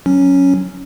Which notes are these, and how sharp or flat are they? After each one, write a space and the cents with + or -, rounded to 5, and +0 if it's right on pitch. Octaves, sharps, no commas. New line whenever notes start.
F#3 +0 C#4 +0